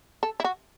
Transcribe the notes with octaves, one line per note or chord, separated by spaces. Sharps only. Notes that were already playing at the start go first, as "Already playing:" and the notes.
A4
E4
F#4